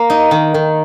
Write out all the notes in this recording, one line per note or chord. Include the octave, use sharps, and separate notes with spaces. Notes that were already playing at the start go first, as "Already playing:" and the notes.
Already playing: A#3
D#4
D#3
D#3